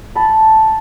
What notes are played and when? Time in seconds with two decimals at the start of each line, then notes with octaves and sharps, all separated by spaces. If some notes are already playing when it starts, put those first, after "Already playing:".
0.15 A5 B5